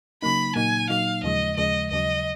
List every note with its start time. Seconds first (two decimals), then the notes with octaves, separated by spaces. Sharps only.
0.22 C#3 F#3 A#3 D#4 B5
0.56 A#2 F#3 A#3 D#4 G#5
0.90 A#2 F#3 A#3 D#4 F5
1.23 D#2 C#3 F3 G#3 D#5
1.57 D#2 C#3 F3 G#3 D#5
1.91 D#2 C#3 F#3 D#5